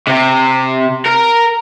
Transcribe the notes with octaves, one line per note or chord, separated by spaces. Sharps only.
C3
A#4